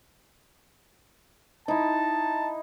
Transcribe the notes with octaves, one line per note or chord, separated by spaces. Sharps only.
D#4 E4 A5